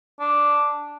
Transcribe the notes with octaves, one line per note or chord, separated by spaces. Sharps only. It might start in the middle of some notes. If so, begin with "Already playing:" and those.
D4